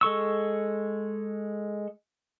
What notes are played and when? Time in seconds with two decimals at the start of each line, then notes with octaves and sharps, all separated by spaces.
0.01 G#3 A4 C#6 E6